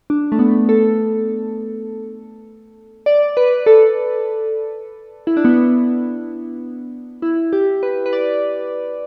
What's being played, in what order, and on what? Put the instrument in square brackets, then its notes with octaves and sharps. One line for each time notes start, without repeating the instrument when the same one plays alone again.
[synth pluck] D4
A3
B3
A4
D5
B4
A4
E4
D4
B3
E4
G4
B4
B4
D5